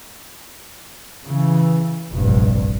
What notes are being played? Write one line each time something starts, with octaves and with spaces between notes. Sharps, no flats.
C#3 E3
F1 A#1 G2